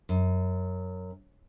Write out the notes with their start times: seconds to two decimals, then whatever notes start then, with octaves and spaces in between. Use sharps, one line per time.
0.09 F#2